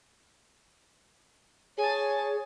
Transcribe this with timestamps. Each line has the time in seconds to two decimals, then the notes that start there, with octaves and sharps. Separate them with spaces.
1.78 G#4 C#5 G#5 A5